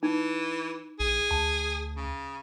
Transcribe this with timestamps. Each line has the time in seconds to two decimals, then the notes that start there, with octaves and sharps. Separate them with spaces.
0.03 E3 D#4
1.00 A#1 G#4
1.31 D2 A5
1.96 C#3